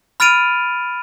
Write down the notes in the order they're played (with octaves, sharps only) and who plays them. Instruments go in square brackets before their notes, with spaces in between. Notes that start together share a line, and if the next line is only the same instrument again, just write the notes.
[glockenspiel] B5 F6 A6 D7 D#7 F7